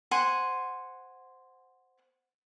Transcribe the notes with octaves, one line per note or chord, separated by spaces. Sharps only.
C5 F#5 G#5 C6